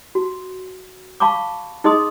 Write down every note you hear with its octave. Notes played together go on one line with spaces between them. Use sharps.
F#4
F5 A5 B5 C#6 D6
D#4 G#4 D#5 C6 D#6